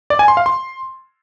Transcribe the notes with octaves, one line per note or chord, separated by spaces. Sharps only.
D5
G#5
C6
F5
C6